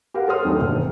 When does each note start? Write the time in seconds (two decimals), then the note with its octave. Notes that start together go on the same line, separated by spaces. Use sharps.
0.14 G4 A#4 F5 F#5
0.28 A4 C5 C#5 C6 D#6 F6
0.44 D#2 F#3 A3 C4 D4 D#4
0.61 E1